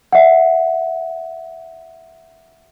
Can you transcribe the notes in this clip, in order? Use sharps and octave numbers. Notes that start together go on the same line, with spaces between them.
E5 F#5